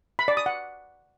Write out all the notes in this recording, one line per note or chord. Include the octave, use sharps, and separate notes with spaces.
B5
D5
D#6
F#5